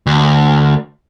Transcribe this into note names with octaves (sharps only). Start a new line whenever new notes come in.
D2